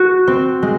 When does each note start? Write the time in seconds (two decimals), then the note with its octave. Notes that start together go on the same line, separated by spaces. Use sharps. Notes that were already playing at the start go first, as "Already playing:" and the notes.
Already playing: F#4
0.27 C4
0.62 G#3